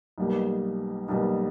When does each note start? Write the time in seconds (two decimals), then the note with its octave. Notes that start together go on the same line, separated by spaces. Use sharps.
0.18 B1 B2 G3 A#3
1.08 B1 B2 G3 A#3